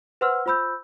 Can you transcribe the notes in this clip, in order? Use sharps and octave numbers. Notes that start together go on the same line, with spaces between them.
B4 C5 F#5 C6 E6 F6
F4 C5 B5 E6 G6